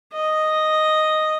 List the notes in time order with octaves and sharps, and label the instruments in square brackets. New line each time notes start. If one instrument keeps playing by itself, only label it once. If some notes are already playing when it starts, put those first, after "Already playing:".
[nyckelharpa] D#5